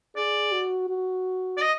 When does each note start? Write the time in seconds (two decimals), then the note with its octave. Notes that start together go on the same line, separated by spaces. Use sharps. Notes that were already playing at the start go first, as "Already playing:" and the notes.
0.16 G#4 D5
0.52 F#4
0.90 F#4
1.57 D5
1.61 D#5